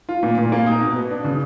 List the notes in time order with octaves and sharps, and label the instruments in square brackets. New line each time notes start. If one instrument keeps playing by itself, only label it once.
[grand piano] F4
A#2
A#2
A#3
D#4
B2
B3
D4
C#3